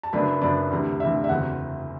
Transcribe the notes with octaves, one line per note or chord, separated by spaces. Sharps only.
A5
F#1 F#2 F#3 B3 D4 B5
F#1 F#2 F#3 B3 D4 D5
D2 C3 E3
D2 C3 E3 E5
E5
F#1 E2 D3 F#3 C4 F#5